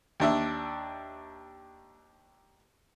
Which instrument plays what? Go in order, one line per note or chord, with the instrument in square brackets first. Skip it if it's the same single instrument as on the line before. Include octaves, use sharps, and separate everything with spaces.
[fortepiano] D#2 D4 E5